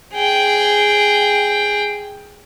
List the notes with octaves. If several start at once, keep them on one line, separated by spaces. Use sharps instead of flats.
G#4 G5